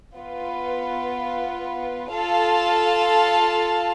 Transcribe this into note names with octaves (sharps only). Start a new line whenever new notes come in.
B3 F4 B4
F4 A4 F5 A5